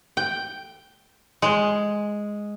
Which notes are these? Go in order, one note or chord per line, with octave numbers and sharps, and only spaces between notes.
G5
G#3